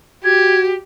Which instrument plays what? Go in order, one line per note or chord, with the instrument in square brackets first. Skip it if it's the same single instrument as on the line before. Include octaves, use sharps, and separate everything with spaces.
[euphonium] F#4 [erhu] G4 [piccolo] G#6